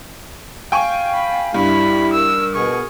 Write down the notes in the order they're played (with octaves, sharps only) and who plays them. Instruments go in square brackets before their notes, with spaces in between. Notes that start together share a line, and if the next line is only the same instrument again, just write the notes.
[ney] F5 [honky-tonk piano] G5 G#5 C#6
[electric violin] B5
[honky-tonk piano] G2 [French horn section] G3 E4 [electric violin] B5
[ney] A#4 [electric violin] E6
[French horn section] B2 [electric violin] G#4 C#6